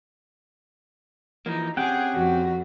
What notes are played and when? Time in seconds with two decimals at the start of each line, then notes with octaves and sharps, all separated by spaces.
1.46 E3 F3 A#3 D#4
1.77 C4 C#4 G4 G#4 F#5 G5
2.13 F2 F#4